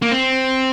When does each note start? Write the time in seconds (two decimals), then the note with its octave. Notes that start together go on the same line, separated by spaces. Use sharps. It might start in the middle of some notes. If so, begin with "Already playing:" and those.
0.02 A#3
0.11 C4